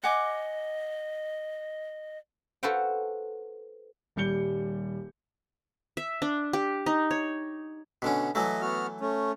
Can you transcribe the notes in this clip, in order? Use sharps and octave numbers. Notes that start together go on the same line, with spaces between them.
D#5 F#5 G#5 D6
F#4 A4 B4 C5 F5 G5
D#1 G3 G6 C#7 G7
E5
D4
G4
D#4
C#5
B2 D3 C#4
E3 F#3 A3 D#5
B3 F#4 F6
A3 C#4